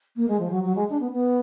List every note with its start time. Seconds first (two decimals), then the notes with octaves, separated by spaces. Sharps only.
0.16 A#3
0.28 G#3
0.39 F3
0.51 F#3
0.64 F#3
0.76 G#3
0.90 D4
1.00 B3
1.12 B3